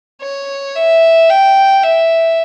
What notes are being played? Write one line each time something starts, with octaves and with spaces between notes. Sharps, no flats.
C#5
E5
G5
E5